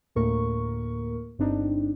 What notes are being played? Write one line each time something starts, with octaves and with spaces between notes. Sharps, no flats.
D2 A2 A#3 A#4 C#6
G1 G2 C4 D4 D#4